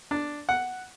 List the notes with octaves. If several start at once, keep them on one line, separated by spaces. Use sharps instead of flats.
D4
F#5